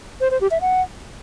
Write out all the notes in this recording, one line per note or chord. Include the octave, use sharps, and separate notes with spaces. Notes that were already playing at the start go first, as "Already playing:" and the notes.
C5
C5
G4
E5
F#5